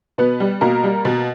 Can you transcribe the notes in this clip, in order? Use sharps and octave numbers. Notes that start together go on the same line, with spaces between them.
B2 B3 B4
G3
B2 A#3 A#4
G3
B2